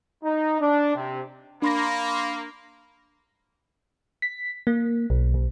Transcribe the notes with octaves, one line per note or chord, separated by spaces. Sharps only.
D#4
D4
C3
A#3 D4 B5 C6 A#6
B6
A#3
B1
B1